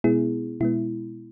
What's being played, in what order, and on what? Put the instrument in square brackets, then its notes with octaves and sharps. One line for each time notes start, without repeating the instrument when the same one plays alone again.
[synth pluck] B2 G#3 B3 E4 G#4
B2 G#3 B3 E4